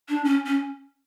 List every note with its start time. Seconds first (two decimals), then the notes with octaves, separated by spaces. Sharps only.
0.09 D4
0.24 C#4
0.46 C#4